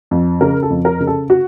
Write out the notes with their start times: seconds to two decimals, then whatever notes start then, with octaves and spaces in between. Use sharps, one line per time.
0.11 F2
0.41 C#3 A#4
0.63 A4
0.70 F2
0.85 A#4
1.00 C#3
1.07 A4
1.30 F#4